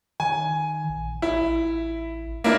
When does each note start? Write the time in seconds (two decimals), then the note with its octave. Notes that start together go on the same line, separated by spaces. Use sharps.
0.20 D#3 G#5
0.89 A#1
1.22 A1 E4
2.44 A#3 D4 E4